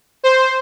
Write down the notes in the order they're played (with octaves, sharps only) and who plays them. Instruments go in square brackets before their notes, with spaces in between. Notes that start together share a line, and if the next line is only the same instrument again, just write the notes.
[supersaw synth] C5